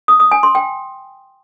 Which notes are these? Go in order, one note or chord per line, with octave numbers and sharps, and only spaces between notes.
D#6
D#6
G#5
C6
G5